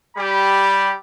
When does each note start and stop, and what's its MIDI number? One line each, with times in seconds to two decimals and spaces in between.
0.16 0.92 55
0.16 0.92 67
0.16 0.92 83